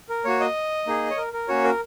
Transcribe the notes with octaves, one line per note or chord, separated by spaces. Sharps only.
A#4
A#3 F#4 C#5
D#5
A#3 D#4 G#4
C#5
A#4
A#4
A#3 C#4 F#4 C#5
A#4